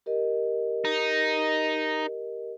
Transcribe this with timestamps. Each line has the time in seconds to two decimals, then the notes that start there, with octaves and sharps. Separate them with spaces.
0.06 G4 A#4 D#5
0.85 D#4